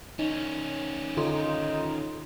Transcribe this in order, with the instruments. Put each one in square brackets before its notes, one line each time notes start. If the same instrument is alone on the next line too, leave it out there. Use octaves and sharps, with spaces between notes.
[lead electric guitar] D#3 C#4 [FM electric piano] D#4
[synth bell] D3 A4 C6 [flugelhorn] D#4 [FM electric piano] F4